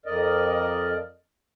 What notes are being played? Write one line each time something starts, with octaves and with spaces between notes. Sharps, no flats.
F2 A#4 D5 D#5